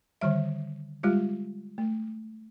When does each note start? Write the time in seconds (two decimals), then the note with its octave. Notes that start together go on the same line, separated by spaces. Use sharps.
0.21 D3 D#3 G3 E5
1.03 G3 G#3 F4 G4
1.78 A3